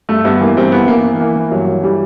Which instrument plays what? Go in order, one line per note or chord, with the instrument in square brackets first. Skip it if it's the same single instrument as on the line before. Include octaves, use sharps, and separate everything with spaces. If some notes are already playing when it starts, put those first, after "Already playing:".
[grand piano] G2 A3
G2 B3
E3 A#3
G2 C4
E3 B3
E3 A#3
E3
E3 A#3
E3
G2 F#3
E3
E3 G3